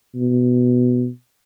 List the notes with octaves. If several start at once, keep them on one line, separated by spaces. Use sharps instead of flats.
B2